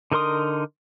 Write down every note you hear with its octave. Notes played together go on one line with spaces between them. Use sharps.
D3 D#4 A#4 C6 D#6